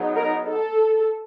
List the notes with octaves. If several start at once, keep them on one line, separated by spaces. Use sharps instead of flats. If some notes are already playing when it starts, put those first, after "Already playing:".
Already playing: F#3 B3 D#4 G#4
A#4
A4